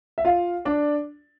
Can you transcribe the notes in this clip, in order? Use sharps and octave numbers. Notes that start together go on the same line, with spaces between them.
E5
F4 F5
D4 D5